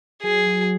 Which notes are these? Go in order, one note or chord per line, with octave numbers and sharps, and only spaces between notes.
F#3 G#4
F#3